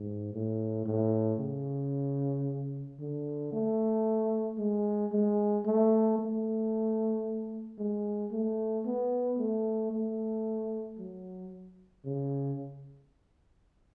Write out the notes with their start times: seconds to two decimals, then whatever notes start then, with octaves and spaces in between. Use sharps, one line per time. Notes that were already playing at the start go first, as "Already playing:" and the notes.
Already playing: G#2
0.33 A2
0.86 A2
1.39 C#3
3.00 D3
3.53 A3
4.58 G#3
5.12 G#3
5.66 A3
6.19 A3
7.78 G#3
8.32 A3
8.85 B3
9.39 A3
9.91 A3
10.98 F#3
12.05 C#3